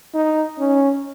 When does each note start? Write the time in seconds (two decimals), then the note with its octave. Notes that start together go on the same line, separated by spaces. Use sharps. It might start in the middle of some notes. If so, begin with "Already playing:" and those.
0.14 D#4
0.59 C#4